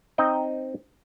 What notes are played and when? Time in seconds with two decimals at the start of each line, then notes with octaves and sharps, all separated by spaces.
0.18 C4 D#4 D#5 G5